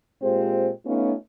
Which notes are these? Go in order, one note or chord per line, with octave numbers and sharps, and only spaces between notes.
A#2 G#3 C4 F4 G4 C5
A3 B3 C#4 D#4 F4